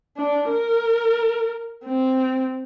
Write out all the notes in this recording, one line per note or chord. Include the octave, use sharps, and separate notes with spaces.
D4
A#4
C4